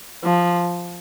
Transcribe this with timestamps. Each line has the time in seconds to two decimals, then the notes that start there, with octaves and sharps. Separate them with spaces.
0.24 F3